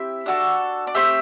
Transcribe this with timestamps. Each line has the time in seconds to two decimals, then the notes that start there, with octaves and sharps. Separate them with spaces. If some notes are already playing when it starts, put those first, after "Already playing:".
Already playing: C4 E4 G4 E5
0.26 D4 F#4 A4
0.87 D5
0.95 A3 C4 G4 E5